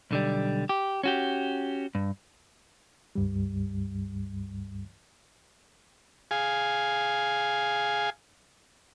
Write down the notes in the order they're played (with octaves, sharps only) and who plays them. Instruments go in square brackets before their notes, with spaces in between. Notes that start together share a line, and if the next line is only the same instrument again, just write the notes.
[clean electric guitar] B1 D3 G3
G4
C#4 F#4 G4
G2
[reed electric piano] C#2 G2 G3
[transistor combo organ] G#4 F5 G#5